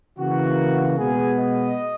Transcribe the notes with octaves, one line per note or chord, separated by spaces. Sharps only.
C#3 E3 A#3 F#4
B2 G#3 B3 G#4
D#5